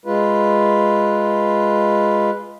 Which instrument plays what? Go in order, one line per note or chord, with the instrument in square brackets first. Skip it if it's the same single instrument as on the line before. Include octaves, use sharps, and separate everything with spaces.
[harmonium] G#3 F4 B4